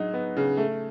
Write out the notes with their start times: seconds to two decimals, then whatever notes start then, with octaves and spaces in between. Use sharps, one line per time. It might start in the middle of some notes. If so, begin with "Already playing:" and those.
Already playing: F#3 G#3 D#4
0.13 B3
0.36 C#3
0.57 A3